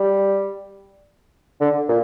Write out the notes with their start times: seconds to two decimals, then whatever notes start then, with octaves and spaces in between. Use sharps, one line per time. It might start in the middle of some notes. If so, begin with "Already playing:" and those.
Already playing: G3
1.61 D3
1.89 A#2